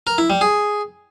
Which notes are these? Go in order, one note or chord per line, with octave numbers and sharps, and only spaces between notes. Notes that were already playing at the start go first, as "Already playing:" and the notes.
A#4
E4
G3
G#4